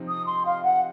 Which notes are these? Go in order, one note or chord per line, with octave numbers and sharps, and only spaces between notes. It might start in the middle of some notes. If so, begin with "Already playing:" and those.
Already playing: C3 F3 C4 D#4
D#6
C6
F5
F#5